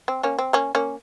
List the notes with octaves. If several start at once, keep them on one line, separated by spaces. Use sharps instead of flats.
C4
A#3 C#4
C4
A#3 C#4
A#3 C#4